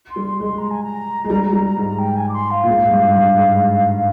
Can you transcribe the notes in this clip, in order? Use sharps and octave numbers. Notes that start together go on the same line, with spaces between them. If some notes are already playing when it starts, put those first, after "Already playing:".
C6
G3
C6
G#3
C6
A#5
G#5
A#5
G#3
G3
G3
G#2
G5
G#5
D6
C6
F5
A#2
G#2
G2
G2
G#2